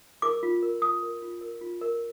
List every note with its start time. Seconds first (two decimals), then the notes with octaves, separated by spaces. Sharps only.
0.22 A#4 D6
0.43 F4
0.62 A#4
0.82 F4 D#6
1.03 A#4
1.22 F4
1.41 A#4
1.61 F4
1.81 A#4